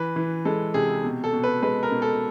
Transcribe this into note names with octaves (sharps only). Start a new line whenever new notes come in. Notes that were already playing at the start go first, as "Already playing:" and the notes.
Already playing: E3 B4
E3
G#3 A4
C3 G#4
B2
A4
B2
B4
G#3 B4
A#4
B2
A4